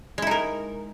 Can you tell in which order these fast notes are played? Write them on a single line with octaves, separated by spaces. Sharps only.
G#3 E4 D#4 A#4